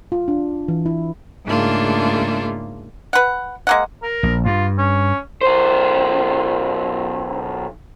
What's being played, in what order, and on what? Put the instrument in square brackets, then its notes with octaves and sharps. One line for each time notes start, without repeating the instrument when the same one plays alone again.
[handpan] F4
D4
E3
E4
[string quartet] G#2 C#3 A3 A#3 D4 F4
[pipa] B4 F#5
G#3 A#3 F#5
[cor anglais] A#4
[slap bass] A#1
[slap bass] G2 [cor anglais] F4
[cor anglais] C#4
[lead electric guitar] B1 C5